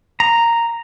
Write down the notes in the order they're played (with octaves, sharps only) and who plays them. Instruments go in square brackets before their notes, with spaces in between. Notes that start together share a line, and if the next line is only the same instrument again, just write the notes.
[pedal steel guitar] A#5